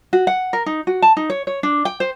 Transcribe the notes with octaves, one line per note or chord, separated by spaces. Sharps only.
F#4
F#5
A#4
D#4
F#4
A5
D#4
C#5
C#5
D4
G5
C5